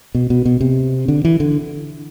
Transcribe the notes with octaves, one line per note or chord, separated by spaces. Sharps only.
B2
B2
B2
C3
D3
E3
D3